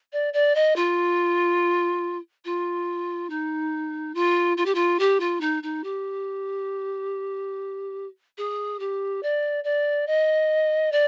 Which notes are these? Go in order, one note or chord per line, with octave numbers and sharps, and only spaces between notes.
D5
D5
D#5
F4
F4
D#4
F4
F4
G4
F4
G4
F4
D#4
D#4
G4
G#4
G4
D5
D5
D#5
D5